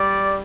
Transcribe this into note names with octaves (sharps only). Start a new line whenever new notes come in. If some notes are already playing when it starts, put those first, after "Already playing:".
Already playing: G3 D5